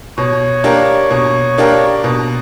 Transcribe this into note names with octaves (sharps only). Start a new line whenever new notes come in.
B2 C#5
A#3 D4 G4 A#4
B2
A#3 D4 G4 A#4
B2